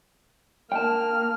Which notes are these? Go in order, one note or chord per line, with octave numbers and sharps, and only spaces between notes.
A#3 G5 A5 F6